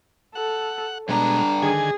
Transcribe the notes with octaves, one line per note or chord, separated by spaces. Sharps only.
A4 F#5
G2 B2 G#3 D4 A#5
D3 D#3 G#4 G#5